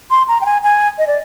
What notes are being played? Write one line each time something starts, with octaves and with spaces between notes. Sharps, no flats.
C6
A#5
G5
G#5
G#5
D#5
D5